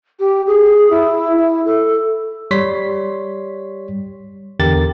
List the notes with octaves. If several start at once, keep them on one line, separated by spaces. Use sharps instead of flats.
G4
G#4
E4
E4
A4
G3 C#5 C6 B6
E2 D3 G4 A#4 A6